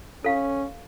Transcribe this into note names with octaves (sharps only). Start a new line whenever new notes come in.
C#4 A4 F5